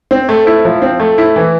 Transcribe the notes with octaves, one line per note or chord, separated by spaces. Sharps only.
C4
A3
E4
F3
C4
A3
E4
E3